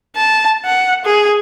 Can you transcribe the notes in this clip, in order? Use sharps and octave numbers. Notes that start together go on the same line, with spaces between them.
A5
F#5
G#4